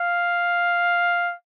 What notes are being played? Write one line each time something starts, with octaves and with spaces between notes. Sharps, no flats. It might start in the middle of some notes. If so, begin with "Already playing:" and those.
Already playing: F5